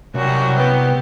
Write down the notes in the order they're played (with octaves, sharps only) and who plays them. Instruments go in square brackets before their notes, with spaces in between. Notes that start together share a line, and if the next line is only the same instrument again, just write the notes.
[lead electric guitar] C2 [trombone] F#2 [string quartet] F#3 G3 F#4
[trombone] B3 [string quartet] G4